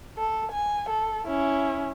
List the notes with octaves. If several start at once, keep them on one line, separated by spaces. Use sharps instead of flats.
A4
G#5
A4
C#4 E4